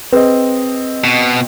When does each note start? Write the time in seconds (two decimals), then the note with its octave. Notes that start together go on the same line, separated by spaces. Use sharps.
0.12 C4 G#4 B4 D#5
1.04 B2